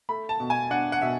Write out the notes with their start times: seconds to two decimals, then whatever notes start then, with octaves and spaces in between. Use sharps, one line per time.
0.09 A3 B5
0.29 A5
0.40 B2
0.50 G#5
0.70 D4 F#5
0.92 F#5
1.02 B2 E5